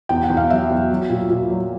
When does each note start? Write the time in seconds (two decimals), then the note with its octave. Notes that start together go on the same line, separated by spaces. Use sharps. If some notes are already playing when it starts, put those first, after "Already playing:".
0.09 E2 G5
0.23 F#5
0.30 E2
0.37 F5
0.50 F#3 E5
0.70 E2
0.90 F#3
1.10 A#2
1.30 A#2
1.50 F#3